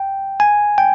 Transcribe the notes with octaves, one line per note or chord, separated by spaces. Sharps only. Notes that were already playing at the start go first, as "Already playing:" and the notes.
Already playing: G5
G#5
G5